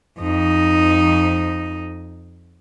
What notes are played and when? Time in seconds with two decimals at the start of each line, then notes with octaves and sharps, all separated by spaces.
0.20 F2 D#4